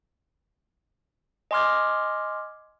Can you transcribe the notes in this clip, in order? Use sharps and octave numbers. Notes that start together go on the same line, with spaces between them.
D#5 G#5 C6 D6 F6 G#6